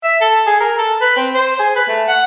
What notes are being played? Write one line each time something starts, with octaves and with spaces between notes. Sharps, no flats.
E5
A4
G#4
A#4
A4
B4
C4
C5
G#4
B4
A3
F#5